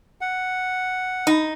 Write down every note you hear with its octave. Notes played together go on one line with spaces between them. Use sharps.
F#5
D#4